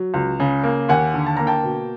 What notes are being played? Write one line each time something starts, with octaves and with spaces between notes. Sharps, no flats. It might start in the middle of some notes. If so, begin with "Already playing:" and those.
Already playing: F#3
C#2
C#3
A#3
D#2 F#5 G#5
D3
A5
A#3 A#5
G5 A5
B2